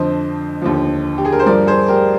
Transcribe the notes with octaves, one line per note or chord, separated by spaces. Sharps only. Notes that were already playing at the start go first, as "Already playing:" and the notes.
Already playing: F2 D3 F3 C5 D#5
D#2 D3 F3
G4
G#4
A#4
C5
G2 F3 A#4 D5
G#4 C5
G4 A#4